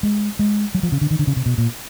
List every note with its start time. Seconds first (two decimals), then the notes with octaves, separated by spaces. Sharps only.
0.03 G#3
0.39 G#3
0.74 F#3
0.83 F3
0.92 C#3
1.01 D3
1.11 D#3
1.19 D3
1.27 C#3
1.36 C3
1.46 B2
1.58 A#2